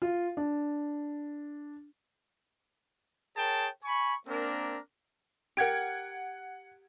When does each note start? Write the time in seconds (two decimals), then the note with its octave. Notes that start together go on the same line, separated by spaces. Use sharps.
0.02 F4
0.37 D4
3.37 G#4 A#4 C#5 G5 A5
3.85 G#5 B5 C#6
4.27 A#3 C4 D4 A#4
5.57 G4 A#4 F#5 G#6 D7